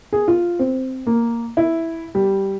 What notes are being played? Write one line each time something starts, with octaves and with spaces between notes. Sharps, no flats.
G#4
F4
C4
A#3
E4
G3